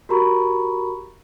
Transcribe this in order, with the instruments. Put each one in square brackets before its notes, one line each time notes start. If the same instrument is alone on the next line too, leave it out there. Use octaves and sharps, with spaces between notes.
[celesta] F#4 G4 A#4 A#5 B5 C#6